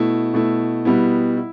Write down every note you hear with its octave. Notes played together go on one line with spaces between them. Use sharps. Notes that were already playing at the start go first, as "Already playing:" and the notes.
Already playing: B2 A3 E4
B2 A3 E4
B2 G3 B3 E4
E4